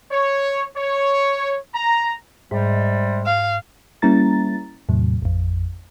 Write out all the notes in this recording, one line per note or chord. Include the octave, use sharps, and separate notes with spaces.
C#5
C#5
A#5
G#2 C3 G3 G#3
F5
G3 A#3 C#4 E4 A#5 A6
E2 A2 C3 F#3
A1 F2